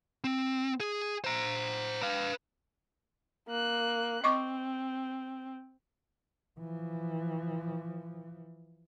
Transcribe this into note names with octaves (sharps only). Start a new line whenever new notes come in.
C4
G#4
C5 A#5
B4 F5
A#3 F#6
C4 D#5 C#6 D6
E3 F3